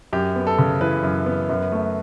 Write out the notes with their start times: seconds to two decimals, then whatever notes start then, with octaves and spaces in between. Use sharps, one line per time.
0.13 F#2 G4
0.36 B3
0.47 A4
0.59 C#3
0.81 E3 B4
1.03 F#2
1.26 B3
1.49 F#2
1.72 A3